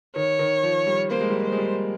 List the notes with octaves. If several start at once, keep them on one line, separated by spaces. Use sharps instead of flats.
D#3 C#5
D#3
F3
G3
A#3 C5
G#3
G3
G#3 C5
G#3
G3